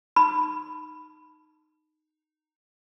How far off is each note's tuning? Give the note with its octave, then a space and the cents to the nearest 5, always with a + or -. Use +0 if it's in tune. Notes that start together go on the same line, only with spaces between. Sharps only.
D#4 -10 B5 +0